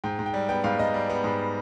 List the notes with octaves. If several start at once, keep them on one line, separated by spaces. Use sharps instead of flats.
G#2 G5
G#2
G5
G3
B3 G5
G#2 F5
G#2 D#5
G3
B3
G#2